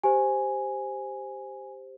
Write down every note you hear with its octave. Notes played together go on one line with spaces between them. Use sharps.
G4 C5 G#5